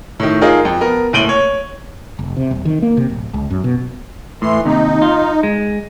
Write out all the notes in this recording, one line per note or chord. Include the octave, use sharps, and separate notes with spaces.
A2 D#3
D#4 F4 G#4 A#4
F2
B3 A#4
F#1 A2 D7 D#7 F#7 G7
C#5
F1
C3
D#1
D#3
A#3
C3
D1
C#2
F#2
B2
A2 E3 C6
D#2 C3 D#4
F4
G#3